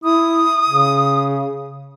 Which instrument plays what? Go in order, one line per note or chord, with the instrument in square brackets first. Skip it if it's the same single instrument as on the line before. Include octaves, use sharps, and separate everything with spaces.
[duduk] E4 [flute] D#6
[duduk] C#3